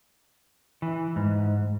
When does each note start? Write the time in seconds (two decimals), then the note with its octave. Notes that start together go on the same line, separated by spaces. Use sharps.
0.82 E3
1.16 G#2